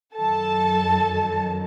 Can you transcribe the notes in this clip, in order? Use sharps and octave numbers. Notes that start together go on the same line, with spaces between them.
F#2 D#3 F#3 A4 A5